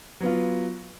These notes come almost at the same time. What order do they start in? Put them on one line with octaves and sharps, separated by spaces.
F#3 B3 F4